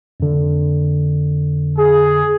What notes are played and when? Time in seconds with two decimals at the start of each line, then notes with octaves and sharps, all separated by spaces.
0.20 F2 D3
1.78 G#4